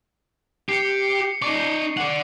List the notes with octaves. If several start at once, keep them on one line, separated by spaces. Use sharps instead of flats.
G4 C7 C#7
D#4 D5 C#6
D5 F#5